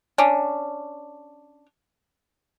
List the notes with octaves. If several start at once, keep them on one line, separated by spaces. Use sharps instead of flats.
C#4 D4